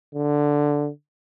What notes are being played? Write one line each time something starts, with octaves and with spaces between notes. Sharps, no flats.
D3